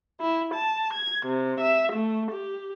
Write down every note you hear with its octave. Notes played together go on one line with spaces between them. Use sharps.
E4
A5
G#6
C3
E5
A3
G4